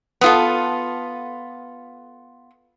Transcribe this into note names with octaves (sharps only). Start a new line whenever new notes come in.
B3 F4 A4